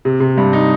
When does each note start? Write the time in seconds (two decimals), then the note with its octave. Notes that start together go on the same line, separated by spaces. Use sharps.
0.05 C3
0.20 C3
0.37 G2
0.53 D#4